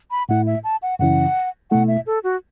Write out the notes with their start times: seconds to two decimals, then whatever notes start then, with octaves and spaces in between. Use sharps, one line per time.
0.11 B5
0.29 A2 A3 E4 F#5
0.46 E5
0.64 A5
0.82 F#5
0.99 F#2 C#3 E3 C#4 E4 F#5
1.71 B2 A3 E4 F#5
1.88 E5
2.06 A4
2.24 F#4